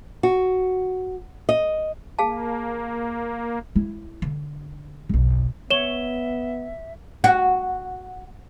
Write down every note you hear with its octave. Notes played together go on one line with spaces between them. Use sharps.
F#4
D#5
A#3 G#4 F5 A5
E4
D3
F#1 B1
B3 C#5 E5 E7 G7
F#4